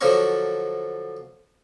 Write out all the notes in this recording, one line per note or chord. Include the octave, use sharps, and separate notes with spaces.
D3 F3 F#3 D4 A#4 C#6